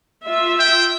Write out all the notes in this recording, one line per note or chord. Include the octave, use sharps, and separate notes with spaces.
F4 E5
G5